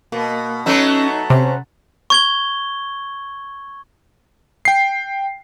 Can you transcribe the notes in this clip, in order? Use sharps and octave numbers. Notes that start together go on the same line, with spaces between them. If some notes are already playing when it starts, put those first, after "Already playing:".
B2 A#3
F#3 A3 B3 C#4 D#4 E6 G6
C3 C#4 C5 A#5 C6
C#6 G#6 G7
G5 C7